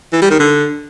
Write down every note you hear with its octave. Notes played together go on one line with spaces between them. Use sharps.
E3
G3
D#3
D3